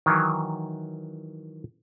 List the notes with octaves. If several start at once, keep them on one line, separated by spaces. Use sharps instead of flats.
D#3 E3 F#3